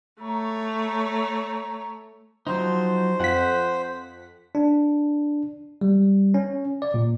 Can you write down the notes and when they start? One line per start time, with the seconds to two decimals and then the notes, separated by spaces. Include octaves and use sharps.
0.22 A3 C#5 A#5
2.47 F3 F#3 D#4 C5
3.20 F2 F#5 B6
4.55 D4
5.81 G3
6.34 C#4
6.82 D5
6.94 A#2